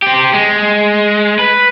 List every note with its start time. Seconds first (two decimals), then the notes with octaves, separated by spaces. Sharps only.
0.02 C4 G4
0.33 G#3
1.39 B4